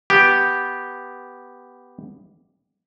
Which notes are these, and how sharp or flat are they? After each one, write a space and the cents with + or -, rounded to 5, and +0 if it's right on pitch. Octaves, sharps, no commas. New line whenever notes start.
B3 +0 G4 +0